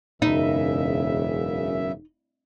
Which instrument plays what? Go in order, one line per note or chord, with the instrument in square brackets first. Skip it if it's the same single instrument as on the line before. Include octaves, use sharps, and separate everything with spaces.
[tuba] E1 [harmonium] F#2 C#3 E5 [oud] D#4